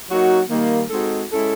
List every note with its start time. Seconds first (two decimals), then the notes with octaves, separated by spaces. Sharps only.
0.09 F#3 A#3 D#4 F#4
0.49 D#3 G3 A#3
0.89 G#3 C4 D#4 F#4 A4
1.30 G#3 C#4 E4 A4